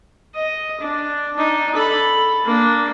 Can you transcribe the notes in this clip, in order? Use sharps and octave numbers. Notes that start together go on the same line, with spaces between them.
D#5
D4
D4 D#4
A4 B5
A#3 D4